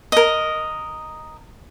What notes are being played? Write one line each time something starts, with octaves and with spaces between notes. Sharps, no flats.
A#4 D#5